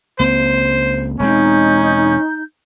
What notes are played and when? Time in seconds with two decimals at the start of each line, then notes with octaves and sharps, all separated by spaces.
0.19 C#2 A#3 C4 C5
1.19 E1 G#3 C4 C#4 D#4 G6